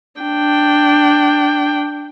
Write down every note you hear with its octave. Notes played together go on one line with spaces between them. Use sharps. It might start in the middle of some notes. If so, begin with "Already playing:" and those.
D4 G5